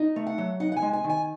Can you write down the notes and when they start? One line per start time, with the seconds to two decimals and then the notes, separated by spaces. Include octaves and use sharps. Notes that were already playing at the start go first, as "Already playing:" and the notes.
Already playing: D#4
0.16 A3
0.27 F#5
0.38 F#3
0.60 D#4 F#5
0.72 F#5
0.76 G#5
0.82 G#3
0.93 G#5
1.04 D#3
1.09 G#5